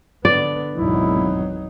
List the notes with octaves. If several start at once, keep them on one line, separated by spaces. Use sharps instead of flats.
D3 B3 D5
G#1 E2 B2 F#3 D#4 E4